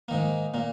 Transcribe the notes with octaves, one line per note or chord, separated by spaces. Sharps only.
G#2 D#3 A#3
A#2 A#3